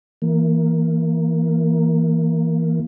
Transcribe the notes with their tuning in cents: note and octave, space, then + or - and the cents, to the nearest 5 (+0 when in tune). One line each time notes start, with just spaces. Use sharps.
E3 +0 A#3 +0